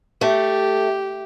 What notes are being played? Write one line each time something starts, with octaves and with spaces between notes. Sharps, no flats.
A3 G4